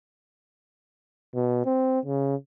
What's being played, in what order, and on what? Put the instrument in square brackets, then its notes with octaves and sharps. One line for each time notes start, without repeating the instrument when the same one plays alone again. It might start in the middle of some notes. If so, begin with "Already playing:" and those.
[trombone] B2
C4
C#3